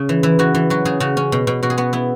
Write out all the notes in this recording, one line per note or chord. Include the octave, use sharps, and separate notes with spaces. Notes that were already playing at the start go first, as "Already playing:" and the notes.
Already playing: C#3
E3
E3 E4
E3 F#4
E3
F#3 F#4
C#3 G#4
C#3 F#4
C#4
B2
B2
B2 F#4
G#4
B3 F#4
B3 E4